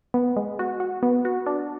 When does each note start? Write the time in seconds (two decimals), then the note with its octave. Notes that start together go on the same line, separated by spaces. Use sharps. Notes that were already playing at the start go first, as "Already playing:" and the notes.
0.14 B3
0.37 G#3
0.59 F#4
0.80 F#4
1.03 B3
1.25 F#4
1.46 D4